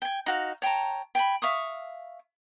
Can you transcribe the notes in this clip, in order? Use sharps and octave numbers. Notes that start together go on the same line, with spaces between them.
G5 G#5
D#4 F#4 F5
C#5 G5 A5 A#5
G5 G#5 B5
E5 F5 C#6 D#6